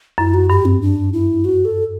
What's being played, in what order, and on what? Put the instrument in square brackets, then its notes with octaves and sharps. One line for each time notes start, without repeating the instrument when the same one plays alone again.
[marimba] F#2 [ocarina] E4
[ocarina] F#4
[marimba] G2 [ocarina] G4
[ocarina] C4
D4
E4
F#4
A4